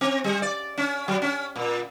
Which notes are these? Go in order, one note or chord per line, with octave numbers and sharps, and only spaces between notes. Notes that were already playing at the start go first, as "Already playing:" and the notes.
C4
G3
D5
C#4
F#3
C#4
A#2